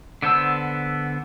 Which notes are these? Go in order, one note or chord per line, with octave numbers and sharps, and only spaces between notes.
D3 B3 C5 A5 E6